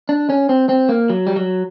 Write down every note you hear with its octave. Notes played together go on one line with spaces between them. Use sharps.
D4
C#4
C4
C4
A#3
F#3
G3
F#3